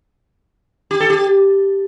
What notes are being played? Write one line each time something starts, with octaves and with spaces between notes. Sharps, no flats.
G4
A4
G4